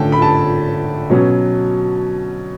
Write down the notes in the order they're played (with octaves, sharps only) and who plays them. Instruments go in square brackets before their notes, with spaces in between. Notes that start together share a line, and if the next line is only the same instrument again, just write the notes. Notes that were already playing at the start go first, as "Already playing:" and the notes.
Already playing: [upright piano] D3 A3 C#4 G5 A5
B5
A5
B2 F#3 C#4